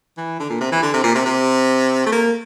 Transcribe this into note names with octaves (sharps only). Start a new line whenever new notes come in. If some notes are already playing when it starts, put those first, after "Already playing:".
E3
D3
A#2
C3
E3
D3
C3
A#2
C3
C3
A3
A#3